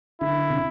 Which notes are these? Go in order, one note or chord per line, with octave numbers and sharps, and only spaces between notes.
D3 E4
C3